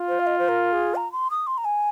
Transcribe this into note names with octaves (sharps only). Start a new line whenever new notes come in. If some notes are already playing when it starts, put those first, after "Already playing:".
Already playing: F4
C5
F5
D#5
C5
A#4
G#4
A#5
C6
D#6
C6
A#5
G#5